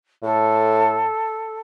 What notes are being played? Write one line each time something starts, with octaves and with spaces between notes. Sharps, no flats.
A2 A4